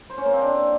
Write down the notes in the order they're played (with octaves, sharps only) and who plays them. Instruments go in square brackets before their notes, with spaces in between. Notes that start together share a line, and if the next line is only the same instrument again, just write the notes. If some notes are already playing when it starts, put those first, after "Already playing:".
[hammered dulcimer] C5
C#4
A#3
C4
D4